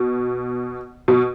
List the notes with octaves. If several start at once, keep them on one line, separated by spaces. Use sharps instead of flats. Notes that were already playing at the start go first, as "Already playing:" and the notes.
Already playing: B2
B2